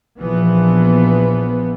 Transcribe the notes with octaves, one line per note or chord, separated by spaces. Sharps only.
A#1 E3 F3 B3